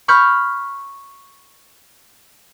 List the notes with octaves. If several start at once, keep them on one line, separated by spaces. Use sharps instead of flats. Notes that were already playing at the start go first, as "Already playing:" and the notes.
B5 C#6 F6 G6